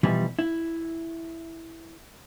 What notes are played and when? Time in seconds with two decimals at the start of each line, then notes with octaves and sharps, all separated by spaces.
0.03 B2 E3 F3 G3
0.39 E4